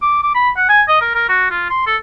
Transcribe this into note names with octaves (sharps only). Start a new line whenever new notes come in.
D6
D6
B5
F#5
G#5
D#5
A#4
A#4
F#4
F4
C6
A4